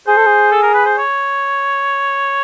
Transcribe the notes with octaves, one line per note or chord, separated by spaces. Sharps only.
G#4 C5
A4
G#4
A4
A#4
B4
C5
C#5